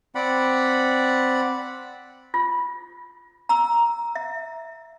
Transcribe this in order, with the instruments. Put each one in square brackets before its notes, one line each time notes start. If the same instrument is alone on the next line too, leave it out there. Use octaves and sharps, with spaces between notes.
[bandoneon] C4 D5 F#5 B5
[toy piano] F4
A#5 E6
E5